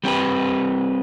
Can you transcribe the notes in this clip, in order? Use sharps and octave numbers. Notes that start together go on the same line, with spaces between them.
G3 C4 G4 B4